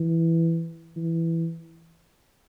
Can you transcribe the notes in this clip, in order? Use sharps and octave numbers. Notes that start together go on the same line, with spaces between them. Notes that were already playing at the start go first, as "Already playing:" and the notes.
Already playing: E3
E3